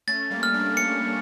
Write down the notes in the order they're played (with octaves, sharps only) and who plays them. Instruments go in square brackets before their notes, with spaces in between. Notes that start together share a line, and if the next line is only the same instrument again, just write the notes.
[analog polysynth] A3 C#4 [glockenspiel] A6
[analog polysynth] G3 A#3
[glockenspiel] F6
[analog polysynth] A#3 D4
[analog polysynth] A3 C#4 [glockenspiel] C#7